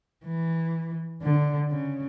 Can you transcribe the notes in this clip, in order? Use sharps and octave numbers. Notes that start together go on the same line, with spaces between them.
E3
D3
C#3